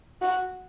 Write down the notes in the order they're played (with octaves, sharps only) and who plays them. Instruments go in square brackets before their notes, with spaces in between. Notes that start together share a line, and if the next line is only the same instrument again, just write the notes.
[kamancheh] F#4